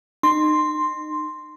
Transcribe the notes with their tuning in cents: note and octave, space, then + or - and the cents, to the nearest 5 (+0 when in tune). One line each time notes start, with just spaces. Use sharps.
D#4 -30 C6 +0